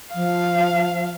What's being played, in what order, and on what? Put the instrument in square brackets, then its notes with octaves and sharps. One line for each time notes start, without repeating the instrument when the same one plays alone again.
[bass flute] F3 [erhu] F5